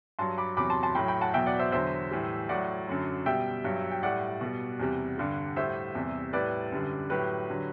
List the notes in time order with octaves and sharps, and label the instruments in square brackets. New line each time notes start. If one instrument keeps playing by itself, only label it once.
[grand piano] G2 F#3 A5 C6
B5 D6
E2 C3 F#3 B5 D6
A5 C6
A5 C6
A2 G5 B5
F#3
G5 B5
F#5 A5
E2 B2 F#3 E5 G5
D5 F#5
C5 E5
E2 D3 F#3 C5 E5
A2 E3 G3
A2 F#3 D5 F#5
F#2 D3 F#3
B2 G3 E5 G5
G2 F#3
G5
A2 G3 D5 F#5
B2 G3
E2 C3 G3
G2 D3 G3
A2 G3 C5 E5
E2 C3 G3
A2 G3 B4 D5
F#2 D3 G3
A2 F#3 G4 B4
D3 F#3